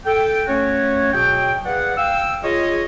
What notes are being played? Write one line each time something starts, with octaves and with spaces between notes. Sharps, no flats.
A4 G5
A3 C#4 F#4 C#5
B2 F#3 F#4 G#4 G5
G#4 B4 D5 F5 F#5
F5 G5 E6
F4 G#4 C#5 D#5